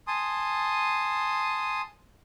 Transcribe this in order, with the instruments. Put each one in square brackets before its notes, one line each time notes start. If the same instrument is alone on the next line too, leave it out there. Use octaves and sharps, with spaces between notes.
[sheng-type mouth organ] G#5 A5 C6 D#6